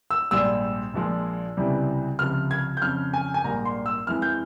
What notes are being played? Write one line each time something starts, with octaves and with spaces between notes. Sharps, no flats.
E6
A#1 G#2 G3 E6
A#1 A#2 F3 G#3
C#2 C3 E3 G3
C#2 C3 F3 F6
G#6
G6
F2 C#3 F3 F6
G#5
G#5
A#1 G#2 G3 A#3 A#5
C6
E6
F2 E3 G#3 F6
G6